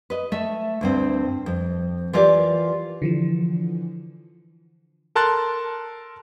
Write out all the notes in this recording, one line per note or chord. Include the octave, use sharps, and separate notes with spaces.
B4 D#5
A3 E5
D2 G2 C4
F2
E3 F4 G4 A#4 D5
D3 E3 F3
A4 A#4 A5 C6 F#6 A6